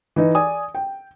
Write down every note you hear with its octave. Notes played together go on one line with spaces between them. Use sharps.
E3 D#4
D5 G#5 D#6
G5